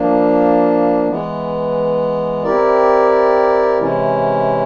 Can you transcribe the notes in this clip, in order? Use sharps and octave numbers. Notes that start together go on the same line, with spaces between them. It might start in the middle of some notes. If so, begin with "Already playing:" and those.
Already playing: F3 A#3 D4
E3 G#3 B3
C4 E4 G4 A#4 D5
C3 E3 G#3 C#4 E4